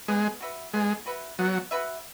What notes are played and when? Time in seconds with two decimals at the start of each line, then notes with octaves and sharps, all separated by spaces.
0.08 G#3 B3
0.41 F#4 B4 E5
0.74 G#3 B3
1.06 F#4 B4 E5
1.39 F#3 B3
1.71 F#4 B4 E5